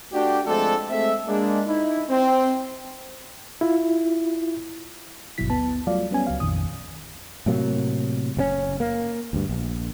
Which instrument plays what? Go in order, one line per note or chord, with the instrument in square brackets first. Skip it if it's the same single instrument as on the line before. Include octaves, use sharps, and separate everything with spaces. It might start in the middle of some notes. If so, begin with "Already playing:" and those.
[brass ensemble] A3 D4 F#4 G4
F3 G#3 A3 C4 D4 A4
G#3 A3 C4 E5
G#3 A#3 D4
D#4 E4
C4
[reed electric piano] E4 F4
[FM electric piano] G#1 G2 B2 F#3 E4 B6
D2 B3 A5
F#3 G3 A3 F4 D5 F5
G3 B3 C#4 G#5
C#2 F#3 F5
A#1 F2 A#2 D#3 D#6
[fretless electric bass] A2 C3 F#3 A#3
F#1 B2 C#4
A#3
D2 G2
A#1